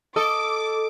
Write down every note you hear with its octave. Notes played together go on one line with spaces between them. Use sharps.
A4 D#5 D6